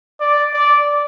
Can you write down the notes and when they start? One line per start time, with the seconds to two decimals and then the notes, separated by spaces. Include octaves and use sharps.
0.20 D5
0.54 D5